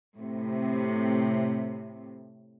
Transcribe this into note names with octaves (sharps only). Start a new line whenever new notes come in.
A2 C3